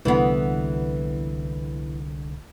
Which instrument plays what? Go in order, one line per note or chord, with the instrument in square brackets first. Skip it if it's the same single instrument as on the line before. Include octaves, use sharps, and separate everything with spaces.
[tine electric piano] C2 D3 [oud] E3 B3